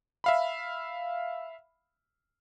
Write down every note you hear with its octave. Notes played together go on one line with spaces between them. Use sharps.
E5 F5 B5